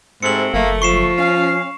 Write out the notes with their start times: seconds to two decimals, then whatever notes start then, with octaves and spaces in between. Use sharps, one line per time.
0.23 G#2 C3 A3 C4 C#7 F#7
0.54 F#1 A3 A#3
0.82 F3 C#6 C7 E7
1.19 C#4 F5